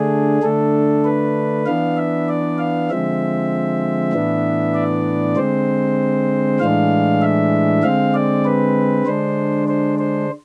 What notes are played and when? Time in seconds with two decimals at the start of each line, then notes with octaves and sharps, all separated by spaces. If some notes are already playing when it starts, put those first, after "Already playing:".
Already playing: D3 A3 D4 G#4
0.43 D3 A3 D4 A4
1.05 B4
1.66 E3 B3 D4 F5
1.97 E5
2.29 D5
2.58 F5
2.90 D3 F3 G#3 C4 E5
4.13 A2 E3 B3 D4
4.75 D5
5.36 D3 G#3 C4 C5
6.60 A2 E3 G#3 D4 F5
7.22 E5
7.83 D3 G#3 C4 F5
8.14 D5
8.45 B4
9.06 D3 G#3 D4 C5
9.68 C5
9.99 C5